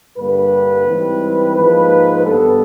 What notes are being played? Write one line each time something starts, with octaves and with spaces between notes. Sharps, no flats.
G2 D3 G3 A#3 B4
G#2 E3 G3 C4
G#2 F3 A#3 B4
G2 D#3 G3 B3 A4